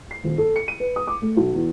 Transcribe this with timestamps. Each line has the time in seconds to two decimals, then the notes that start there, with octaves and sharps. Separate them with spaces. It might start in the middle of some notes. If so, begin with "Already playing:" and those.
0.11 C7
0.24 D#1
0.38 A4
0.56 C#7
0.68 D#7
0.80 B4
0.96 D#6
1.07 D6
1.22 A3
1.37 B1
1.54 E2